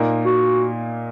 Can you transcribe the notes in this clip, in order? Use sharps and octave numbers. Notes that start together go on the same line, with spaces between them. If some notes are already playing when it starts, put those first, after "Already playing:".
Already playing: A#2 A#3 D#4
F#4